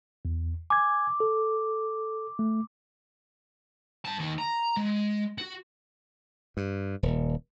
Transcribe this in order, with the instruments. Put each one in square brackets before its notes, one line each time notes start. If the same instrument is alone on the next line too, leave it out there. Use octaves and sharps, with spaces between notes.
[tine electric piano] E2
[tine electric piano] G#5 G#6 [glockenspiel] D6
[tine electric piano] A4
A3
[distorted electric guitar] G2 A5
D#2 D#3
A#5
G#3
F#4
[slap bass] G2
D#1